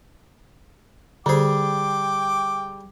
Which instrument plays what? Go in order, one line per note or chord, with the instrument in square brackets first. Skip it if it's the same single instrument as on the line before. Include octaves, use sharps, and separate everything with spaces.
[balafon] D3 C5 [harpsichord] G3 G#4 [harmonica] G5 D6